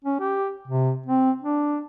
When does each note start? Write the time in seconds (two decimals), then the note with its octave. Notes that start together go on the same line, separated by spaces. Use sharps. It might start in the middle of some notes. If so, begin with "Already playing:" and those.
0.04 C#4
0.19 G4
0.67 C3
1.06 C4
1.41 D4